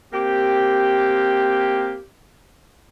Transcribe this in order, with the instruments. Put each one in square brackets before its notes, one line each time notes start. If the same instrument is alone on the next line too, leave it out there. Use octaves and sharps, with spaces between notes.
[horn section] A#3 C4 G4